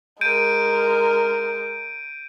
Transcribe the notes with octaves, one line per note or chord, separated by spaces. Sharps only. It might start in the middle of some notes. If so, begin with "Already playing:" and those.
G#3 A#4 G6 D7 D#7